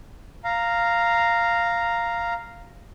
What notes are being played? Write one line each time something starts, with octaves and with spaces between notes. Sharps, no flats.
F5 A#5